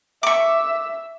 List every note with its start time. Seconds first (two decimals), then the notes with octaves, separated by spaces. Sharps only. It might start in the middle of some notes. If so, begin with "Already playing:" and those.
0.23 E5 C#6 D6